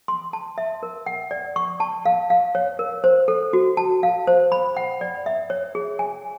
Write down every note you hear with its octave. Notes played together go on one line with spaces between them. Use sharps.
C6
A5
E5
A#4
F#5
D5
C#6
A5
F5
F5
C#5
A#4
C5
A4
F#4
A5
F5
C5
B5
F#5
D5
E5
C#5
G#4
G#5